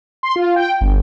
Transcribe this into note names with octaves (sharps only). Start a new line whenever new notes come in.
C6
F4
G5
G1